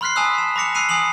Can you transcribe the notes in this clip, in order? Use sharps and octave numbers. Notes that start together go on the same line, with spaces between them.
B5 C6 F6 F#6 B6 C7
G#5 A5 B5 D#6 E6 F#6
E7
B5 D6 A#6 C#7 F7
B5 E6 F#6 C7 D#7 F7
G#5 D#6 C7 F7 F#7